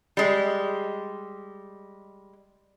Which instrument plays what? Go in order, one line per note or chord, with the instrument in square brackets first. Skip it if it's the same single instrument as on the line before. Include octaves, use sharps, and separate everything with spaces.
[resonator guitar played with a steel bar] G3 G#3